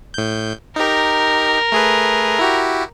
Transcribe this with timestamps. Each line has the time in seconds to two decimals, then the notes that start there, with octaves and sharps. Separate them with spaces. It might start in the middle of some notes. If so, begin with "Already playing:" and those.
0.14 A2 G6
0.76 D#4 G4 A#4
1.72 A3 G#4 B4
2.39 E4 F#4 G4